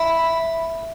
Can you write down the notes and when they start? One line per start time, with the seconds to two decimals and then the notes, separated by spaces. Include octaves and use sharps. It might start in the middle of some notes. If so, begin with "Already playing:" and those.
Already playing: E5 B5